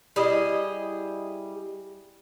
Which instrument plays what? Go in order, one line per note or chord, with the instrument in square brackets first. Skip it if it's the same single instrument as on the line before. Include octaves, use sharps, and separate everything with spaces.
[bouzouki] G3 E4 G#4 D#5